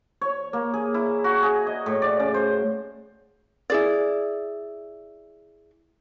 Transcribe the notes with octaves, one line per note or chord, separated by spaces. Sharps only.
C#5
A#3
G#4
E4
F#4
G#4
D#5
A2
D5
C#3
C5
E4 G#4 D5